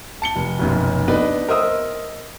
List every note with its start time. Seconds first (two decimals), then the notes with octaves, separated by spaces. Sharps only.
0.22 A5 C#7 G7
0.36 F1
0.59 F1 B1 F#2
1.08 B3 D4 D#4 B4
1.49 A#4 C5 D#5 E5 D#6 E6